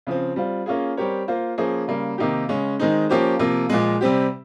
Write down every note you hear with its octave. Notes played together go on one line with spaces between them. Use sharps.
C#3 F3 C4
G3 C4 F4
A#3 C#4 F4 G#4
G3 C4 G4 A#4 C#5
A#3 F4 C5
F3 A#3 C#4 G#4 C5
C#3 G3 A#3
C3 D#3 A#3 D#4 G4
C#3 G#3 C#4
D#3 G#3 C4 D#4
F3 A#3 C#4 G4 C5
C3 F3 A#3
A#2 F3 G#3
C3 G3 C4 G4